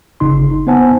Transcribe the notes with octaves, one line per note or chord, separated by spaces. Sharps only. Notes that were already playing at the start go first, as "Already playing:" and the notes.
G1 C#3 D#4 C6
B3 D#4 C5 F#5 G#5 A5